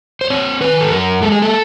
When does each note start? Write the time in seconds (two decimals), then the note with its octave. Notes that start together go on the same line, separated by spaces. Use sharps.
0.21 C5
0.30 C4 C#5
0.61 D#3 B4
0.81 A4
0.91 F#2 A#4
1.22 G#3 A4
1.32 G#4
1.42 A4